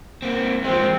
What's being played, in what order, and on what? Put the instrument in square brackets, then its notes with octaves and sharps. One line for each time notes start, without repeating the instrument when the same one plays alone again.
[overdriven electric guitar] A#3 C4
[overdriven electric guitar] F3 G#3 [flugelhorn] C4